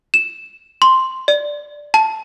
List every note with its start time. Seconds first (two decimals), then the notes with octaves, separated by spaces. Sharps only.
0.14 E7
0.82 C6
1.28 D5
1.94 A5